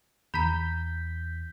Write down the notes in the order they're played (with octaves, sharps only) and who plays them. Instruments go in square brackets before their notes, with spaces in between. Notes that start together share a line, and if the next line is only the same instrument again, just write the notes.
[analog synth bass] E2 [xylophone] A#5 B5 [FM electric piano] G6 B6